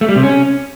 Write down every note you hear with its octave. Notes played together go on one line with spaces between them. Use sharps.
A3
G3
C3
C#4